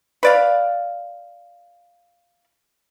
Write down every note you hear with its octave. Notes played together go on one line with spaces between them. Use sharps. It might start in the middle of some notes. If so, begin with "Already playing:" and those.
B4 D5 F5